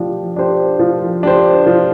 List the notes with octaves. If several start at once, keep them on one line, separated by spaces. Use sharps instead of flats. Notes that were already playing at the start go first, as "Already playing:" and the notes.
Already playing: F3 D4 G4
D4 G4 C5
F3
D4 G4 C5
F3